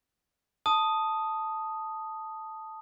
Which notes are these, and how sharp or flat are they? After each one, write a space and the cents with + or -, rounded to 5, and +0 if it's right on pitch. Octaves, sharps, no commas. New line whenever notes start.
A5 +0 D#6 +0